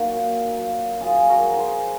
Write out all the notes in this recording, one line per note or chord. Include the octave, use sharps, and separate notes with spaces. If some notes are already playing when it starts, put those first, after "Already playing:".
Already playing: F#3 A#3 C#4 D#4
A#2
F#3 A#3
F#2 F4 G#4
F#4 A#4
F3 G#3
G#4 C5